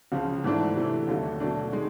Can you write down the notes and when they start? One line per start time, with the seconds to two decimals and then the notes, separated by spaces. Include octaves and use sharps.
0.12 C#2 C#3 F3
0.44 G#2 E3 A3 D4
0.76 C3 E3 A3
1.07 D#2 D3 F#3 A3
1.40 B2 F#3 A3 D4
1.72 D#3 G#3